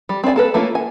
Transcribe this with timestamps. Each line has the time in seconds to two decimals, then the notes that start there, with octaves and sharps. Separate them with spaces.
0.09 G3
0.24 C4 D4 D5 G#5
0.36 A#3 A4 B4
0.54 A3 A#3 C#4 F4
0.75 G#5